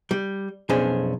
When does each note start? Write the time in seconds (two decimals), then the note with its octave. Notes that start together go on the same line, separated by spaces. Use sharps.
0.11 G3
0.69 B1 F2 C#4 D4 G#4 C5